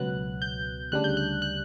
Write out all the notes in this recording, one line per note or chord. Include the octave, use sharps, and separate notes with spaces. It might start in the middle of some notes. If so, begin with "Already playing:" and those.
Already playing: C#2 B2 F#3 B3 F#6
G6
D2 C#3 G3 D4 F#6
G6
F#6
F#6